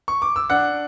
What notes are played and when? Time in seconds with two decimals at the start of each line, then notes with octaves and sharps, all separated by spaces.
0.08 C#6
0.22 D6
0.36 E6
0.50 D4 F#5 F#6